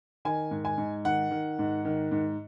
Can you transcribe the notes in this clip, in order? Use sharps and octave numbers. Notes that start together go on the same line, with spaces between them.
D#3 G#5
G#2
G#5
G#2
D#3 F#5
D#3
G#2
D#3
G#2